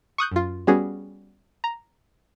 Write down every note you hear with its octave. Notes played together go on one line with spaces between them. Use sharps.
C#6 D#6 F#6 G6
F#2 F4
G3 B3 C#4 F#4 G#4
A#5